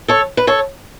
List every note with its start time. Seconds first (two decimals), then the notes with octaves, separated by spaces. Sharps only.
0.08 A4 C#5
0.37 B4
0.47 A4 C#5